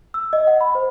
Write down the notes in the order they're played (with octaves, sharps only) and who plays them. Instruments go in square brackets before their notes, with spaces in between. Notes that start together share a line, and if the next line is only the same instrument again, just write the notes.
[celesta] E6
D#5
F#5
B5
C5